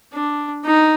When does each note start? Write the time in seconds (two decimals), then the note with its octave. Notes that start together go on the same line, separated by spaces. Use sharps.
0.13 D4
0.65 D#4